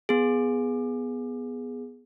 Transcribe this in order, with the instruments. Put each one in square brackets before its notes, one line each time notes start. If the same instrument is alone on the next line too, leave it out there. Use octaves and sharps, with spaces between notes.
[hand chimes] B3 G#4